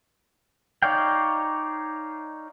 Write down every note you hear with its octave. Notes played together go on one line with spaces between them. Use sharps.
D#4 C#5 D5 F5 G5